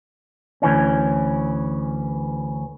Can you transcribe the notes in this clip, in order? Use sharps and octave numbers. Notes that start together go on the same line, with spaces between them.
D2 E3 C#4